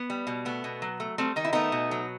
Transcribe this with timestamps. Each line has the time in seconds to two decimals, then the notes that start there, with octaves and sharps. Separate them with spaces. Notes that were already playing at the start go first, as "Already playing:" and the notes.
Already playing: B3
0.10 G3
0.27 B2
0.45 A3 B3
0.64 B2
0.82 F#3
1.00 A3
1.18 G3 A3 C4
1.36 D#3 D#4
1.45 E4
1.53 A3 B3 D#4
1.72 B2
1.91 F#3